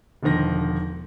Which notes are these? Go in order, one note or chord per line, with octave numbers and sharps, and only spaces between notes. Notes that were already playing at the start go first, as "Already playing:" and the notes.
E1 D3 D#3 F3 A#6